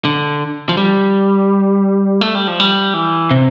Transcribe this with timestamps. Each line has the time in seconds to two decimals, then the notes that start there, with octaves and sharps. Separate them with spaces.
0.05 D3
0.69 F3
0.77 G3
2.21 A3
2.35 G3
2.48 F3
2.60 G3
2.94 E3
3.31 C3